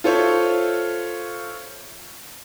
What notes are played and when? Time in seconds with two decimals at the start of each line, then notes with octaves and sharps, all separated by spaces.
0.04 F4 A4 C5 C#5 E5